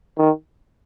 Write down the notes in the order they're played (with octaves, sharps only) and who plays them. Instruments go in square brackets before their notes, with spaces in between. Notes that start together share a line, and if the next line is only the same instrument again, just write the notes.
[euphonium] D#3